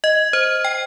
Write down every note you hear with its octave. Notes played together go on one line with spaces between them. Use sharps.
D#5
C5
G5